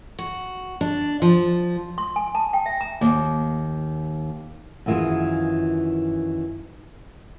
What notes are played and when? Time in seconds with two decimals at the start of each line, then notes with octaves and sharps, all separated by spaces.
0.19 F#4
0.81 D4
1.22 F3
1.98 C6
2.16 G#5
2.35 A5
2.53 G5
2.66 E5
2.81 A#5
3.01 D#2
4.86 F#2 D#3 E3 F4 G#4